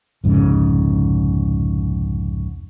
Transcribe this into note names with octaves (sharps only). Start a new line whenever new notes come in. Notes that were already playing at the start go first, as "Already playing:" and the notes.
C2 F2 G#2 C#3